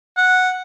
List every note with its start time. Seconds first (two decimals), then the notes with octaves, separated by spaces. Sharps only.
0.17 F#5